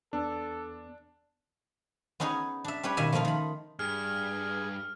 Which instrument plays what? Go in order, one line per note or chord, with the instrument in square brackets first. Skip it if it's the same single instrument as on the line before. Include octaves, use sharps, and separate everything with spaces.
[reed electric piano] E2 B3 A5 [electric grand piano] D4 [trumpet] A4
[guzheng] B3 C#4 D#4 G#4 C#5
D4 E5
G3 C#4 G4 B4 C#5
B2 D#3 A#3 E5 G#5
F3 A3 A#3 D#4 F4
D#3 B5
[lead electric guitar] G2 [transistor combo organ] G#4 [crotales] F6